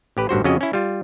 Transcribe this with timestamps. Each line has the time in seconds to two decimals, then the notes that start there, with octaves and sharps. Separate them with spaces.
0.17 A1 G4 B4
0.29 A1 G2 F#4 C5
0.44 F2 C#3 C#4 F#4 D#5
0.61 C#4 E4
0.73 G3 F4